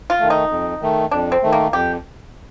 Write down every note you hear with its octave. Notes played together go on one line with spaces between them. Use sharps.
F4
D#3 A3
D#4
F2
D#3 A3
F2 D4
C4
D#3 A3
A#3
F2 G4